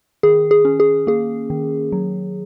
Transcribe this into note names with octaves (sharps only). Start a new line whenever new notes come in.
D#3 G#4
G#4
C#4
G#4
A#3 G#4
D#3
F#3